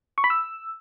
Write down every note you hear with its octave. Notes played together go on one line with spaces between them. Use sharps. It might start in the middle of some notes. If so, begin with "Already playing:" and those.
C#6
B5
E6